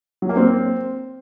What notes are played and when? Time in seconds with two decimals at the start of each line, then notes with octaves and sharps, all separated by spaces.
0.22 F#3
0.29 A#3
0.37 C4